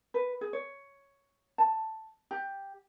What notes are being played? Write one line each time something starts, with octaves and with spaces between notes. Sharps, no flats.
B4
G#4
C#5
A5
G4